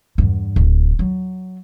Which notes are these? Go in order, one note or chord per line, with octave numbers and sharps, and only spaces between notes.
E2 G2
D1
F#3